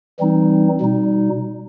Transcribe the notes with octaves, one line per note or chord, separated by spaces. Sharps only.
E3 G3 C4 D#4
B2 G3 D#4